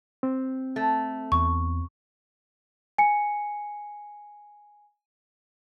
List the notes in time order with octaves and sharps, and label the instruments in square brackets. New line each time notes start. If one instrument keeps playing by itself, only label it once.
[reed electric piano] C4
[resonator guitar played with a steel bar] A3
[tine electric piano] E2 [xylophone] C#6
[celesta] G#5 C#7